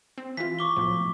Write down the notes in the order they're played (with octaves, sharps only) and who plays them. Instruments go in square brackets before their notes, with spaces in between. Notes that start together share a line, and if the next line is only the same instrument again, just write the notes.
[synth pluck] C4
[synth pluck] E3 F4 [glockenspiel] B6
[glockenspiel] C#6 D6 G7
[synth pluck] B1 A2 F3